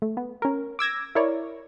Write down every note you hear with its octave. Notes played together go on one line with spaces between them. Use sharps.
A3
B3
C#4 A#4
D6 E6 G#6 A#6
E4 A#4 C#5 D5